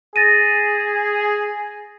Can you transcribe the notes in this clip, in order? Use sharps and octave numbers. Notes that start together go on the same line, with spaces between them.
G#4 A6 A#6 D#7